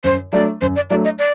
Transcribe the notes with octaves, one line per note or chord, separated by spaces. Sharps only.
F#2 C5
F#3 A3 D4 D5
F#2 C5
D5
F#3 A3 D4 D5
D#5
D5